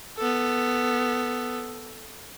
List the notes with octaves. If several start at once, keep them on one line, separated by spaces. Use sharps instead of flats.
B3 A4